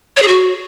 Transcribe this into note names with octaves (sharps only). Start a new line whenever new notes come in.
C#5
G#4
F#4